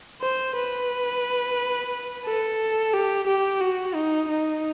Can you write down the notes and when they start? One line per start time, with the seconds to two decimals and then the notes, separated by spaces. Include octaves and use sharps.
0.22 C5
0.56 B4
2.26 A4
2.94 G4
3.27 G4
3.61 F#4
3.95 D#4
4.29 D#4